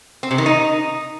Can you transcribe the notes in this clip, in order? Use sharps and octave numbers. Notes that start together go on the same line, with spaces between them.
C4
C3
D#3
D#4